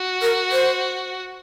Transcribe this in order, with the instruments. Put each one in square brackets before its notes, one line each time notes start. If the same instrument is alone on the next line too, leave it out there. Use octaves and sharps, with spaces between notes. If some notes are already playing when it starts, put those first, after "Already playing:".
Already playing: [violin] F#4
[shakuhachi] A#4
C5